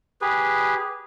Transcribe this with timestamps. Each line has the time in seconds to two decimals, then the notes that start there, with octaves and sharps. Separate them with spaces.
0.21 G4 G#4 B4